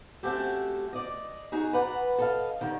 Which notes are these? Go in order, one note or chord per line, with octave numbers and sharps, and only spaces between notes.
A3 C4 C#4 F#4 G4 A4
D5 D#5
D#4 F#4 G#4 C#5
B4 D5 F#5 A#5
A4 D#5 F5
D3 D#3 G3